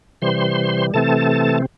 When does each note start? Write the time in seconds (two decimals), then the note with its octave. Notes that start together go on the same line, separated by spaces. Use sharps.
0.22 C3 E3 G3 C5 C6
0.94 C3 E3 A3 C4 A4 A5